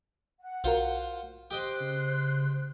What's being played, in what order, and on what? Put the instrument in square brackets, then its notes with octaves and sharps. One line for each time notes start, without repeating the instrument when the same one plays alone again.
[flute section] F#5
[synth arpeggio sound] B1 F#4 A#4 [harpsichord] F4 C5 F5
[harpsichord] G4 D#5 G5 [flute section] C5 F#6
[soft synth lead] C#3